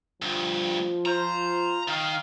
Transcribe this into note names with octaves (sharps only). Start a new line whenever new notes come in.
D2 G2 F3
F4 C5 A#5
D#3 F5